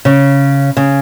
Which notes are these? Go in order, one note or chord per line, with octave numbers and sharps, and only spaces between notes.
C#3
C#3